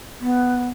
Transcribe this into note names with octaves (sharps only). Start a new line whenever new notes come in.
B3